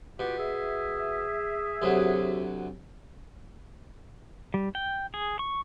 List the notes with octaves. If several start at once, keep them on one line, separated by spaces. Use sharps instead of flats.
B2 F4 G4 F#5
G#4 E5
D2 C3 F#3
G3
G5
G#4
C#6